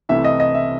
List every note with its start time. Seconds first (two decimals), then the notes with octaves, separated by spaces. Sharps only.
0.09 C2 C3 E3 A3 E5
0.24 D#5
0.40 D#5
0.54 E5